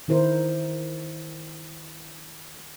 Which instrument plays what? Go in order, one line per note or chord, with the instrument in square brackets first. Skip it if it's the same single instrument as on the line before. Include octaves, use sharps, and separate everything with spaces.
[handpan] D#3 E4 A#4 C5